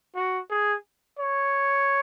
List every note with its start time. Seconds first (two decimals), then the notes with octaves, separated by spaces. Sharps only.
0.16 F#4
0.50 G#4
1.19 C#5